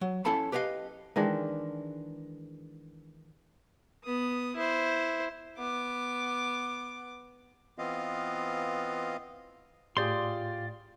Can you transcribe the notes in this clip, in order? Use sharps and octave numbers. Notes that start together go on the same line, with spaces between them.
F#3
C#4 E4 A4 F5 A5 B5
G4 B4 C#5 D#5 F5
D#3 E3 G#3 D4
B3 D#6
E4 C5
B3 D6
E3 B3 C4 F4 D#5 F5
A2 F4 G4 G#4 D5 C6